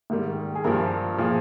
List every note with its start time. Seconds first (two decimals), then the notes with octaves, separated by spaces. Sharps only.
0.10 G#2 D#3 G3
0.55 G#4
0.64 G2 F3 A#4
1.18 A#2 F3 G#4